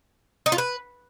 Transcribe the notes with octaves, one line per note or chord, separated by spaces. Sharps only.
D#4
F4
B4